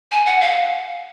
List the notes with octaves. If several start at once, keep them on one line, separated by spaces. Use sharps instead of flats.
G#5
F#5
F5